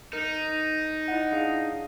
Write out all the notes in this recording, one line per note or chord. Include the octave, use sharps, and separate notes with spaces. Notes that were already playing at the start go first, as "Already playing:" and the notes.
D#4 A#4
E4 D#5 F#5
D4 G#4 F5